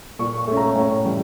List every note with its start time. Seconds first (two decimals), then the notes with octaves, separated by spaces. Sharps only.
0.19 A#2 C#6
0.37 C#6
0.47 A3 C#4
0.57 A#5
0.75 A2 C#5
1.04 E3 G3 C#4